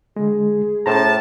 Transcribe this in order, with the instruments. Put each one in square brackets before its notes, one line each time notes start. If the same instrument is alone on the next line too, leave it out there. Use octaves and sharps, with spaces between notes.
[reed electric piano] D3 G#3 [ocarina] G#4
[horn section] A2 A5 [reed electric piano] C#4 C5 A#5